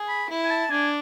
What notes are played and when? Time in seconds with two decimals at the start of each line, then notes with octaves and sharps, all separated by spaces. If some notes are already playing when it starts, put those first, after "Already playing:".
Already playing: G#4
0.09 B5
0.29 E4
0.45 G#5
0.50 A5
0.71 D4 G#5